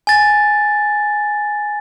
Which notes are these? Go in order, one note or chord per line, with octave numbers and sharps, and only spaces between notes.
G#5 A6